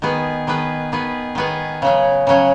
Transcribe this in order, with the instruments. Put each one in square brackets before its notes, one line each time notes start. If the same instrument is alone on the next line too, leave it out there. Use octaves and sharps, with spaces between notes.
[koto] D#3 B3 G#4 B4
D#3 B3 G#4 B4
D#3 B3 G#4 B4
D#3 B3 G#4 B4
C#3 F#3 C#4
C#3 F#3 C#4